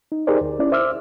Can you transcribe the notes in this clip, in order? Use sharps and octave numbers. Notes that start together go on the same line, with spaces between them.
D#4
D#4 G4 G#4 A#4 C5 D5
D2
C#4 E4 D5
C5 E5 D6 E6 F6